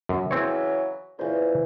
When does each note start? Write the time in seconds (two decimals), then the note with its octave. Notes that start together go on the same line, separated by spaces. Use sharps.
0.09 F#2
0.31 C#3 E3 F#3 C4 C#5
1.19 A#2 C#3 E3 C5